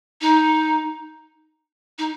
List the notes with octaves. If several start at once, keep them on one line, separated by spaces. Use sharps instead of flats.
D#4
D#4